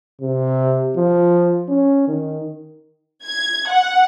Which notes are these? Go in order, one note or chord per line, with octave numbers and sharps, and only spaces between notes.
C3
F3
C#4
D#3
G#6
F#5